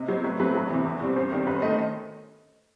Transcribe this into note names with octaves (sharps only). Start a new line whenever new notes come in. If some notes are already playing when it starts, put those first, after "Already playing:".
Already playing: C3 D#5
F#3 B3 C5
A2 B4
F#3 A3 C4 B4
E2 B4
C3 E3
E2
B2 G3 C4
F#2 C5
D#3 G3 C4
F#2 B4
C5
D#3 A3 D#5